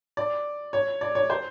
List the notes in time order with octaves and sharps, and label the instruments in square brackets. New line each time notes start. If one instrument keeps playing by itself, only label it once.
[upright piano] D5
C#5
D5
C#5
C5